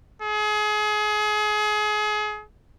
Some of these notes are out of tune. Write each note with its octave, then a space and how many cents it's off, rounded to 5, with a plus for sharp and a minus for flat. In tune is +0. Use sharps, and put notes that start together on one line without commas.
G#4 +30